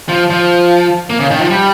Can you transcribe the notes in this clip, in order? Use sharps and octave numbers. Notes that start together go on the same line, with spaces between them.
F3
F3
A#3
C#3
D#3
F3
G3